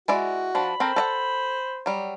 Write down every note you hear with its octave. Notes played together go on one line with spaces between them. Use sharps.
G#3 E4 F#4 D5
F3 D4 B5
C4 A4 A#4 C5
A4 D#5 F#5
F#3 G3